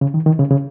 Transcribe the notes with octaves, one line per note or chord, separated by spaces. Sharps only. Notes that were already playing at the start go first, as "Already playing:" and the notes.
C#3
D#3
D#3
C#3
C#3